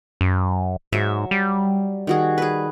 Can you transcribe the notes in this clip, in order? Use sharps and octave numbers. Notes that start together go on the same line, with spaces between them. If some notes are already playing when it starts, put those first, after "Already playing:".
F#2
G#2 F#3 E5
G3
D#3 F#4 G#4
G#4 B4